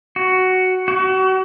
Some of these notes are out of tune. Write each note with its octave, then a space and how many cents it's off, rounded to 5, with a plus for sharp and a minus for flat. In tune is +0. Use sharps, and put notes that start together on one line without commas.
F#4 +5
F#4 +35